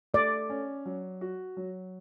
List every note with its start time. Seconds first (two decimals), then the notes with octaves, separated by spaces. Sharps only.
0.14 A3 D5
0.50 C#4
0.86 F#3
1.21 F#4
1.57 F#3